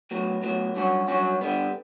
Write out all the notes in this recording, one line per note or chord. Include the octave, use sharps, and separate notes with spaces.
A2 F#3 B3
A2 F#3 B3
G2 F#3 C#4 F#4
G2 F#3 C#4 F#4
D3 G3 B3